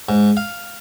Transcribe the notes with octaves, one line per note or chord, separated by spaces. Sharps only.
G#2
F5